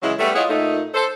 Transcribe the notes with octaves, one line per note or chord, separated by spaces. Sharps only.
C#3 E3 F#3 G#3 E4
G3 A3 B3
E4 F4 G#4 C#5 D#5 F#5
A#2 A3 D#4
A4 C5